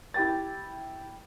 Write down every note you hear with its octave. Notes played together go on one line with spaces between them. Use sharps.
E4 G4 G5 A6